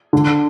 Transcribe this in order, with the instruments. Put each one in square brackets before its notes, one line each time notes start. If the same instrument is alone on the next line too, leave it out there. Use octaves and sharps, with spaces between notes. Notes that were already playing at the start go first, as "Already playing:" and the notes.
[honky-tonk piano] D3